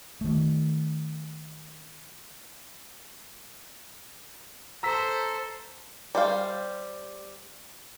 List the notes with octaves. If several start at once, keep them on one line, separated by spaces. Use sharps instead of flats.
D#3 A3
A4 C5 A#5 E6 B6
G3 C5 F5